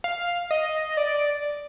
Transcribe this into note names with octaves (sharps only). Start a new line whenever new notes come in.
F5
D#5
D5